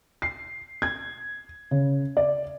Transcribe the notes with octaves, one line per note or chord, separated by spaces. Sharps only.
C7
G#6
C#3
D5